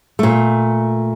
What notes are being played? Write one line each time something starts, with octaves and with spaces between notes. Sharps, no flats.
A#2 A3